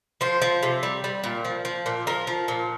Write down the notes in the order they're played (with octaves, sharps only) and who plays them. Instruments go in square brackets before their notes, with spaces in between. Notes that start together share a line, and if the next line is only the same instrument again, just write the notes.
[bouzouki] F3 C5
F3
C3
G3
G3
A#2
F3
F3
A#2
F3 A#4
F3
A#2